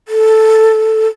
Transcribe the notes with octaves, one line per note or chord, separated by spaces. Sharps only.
A4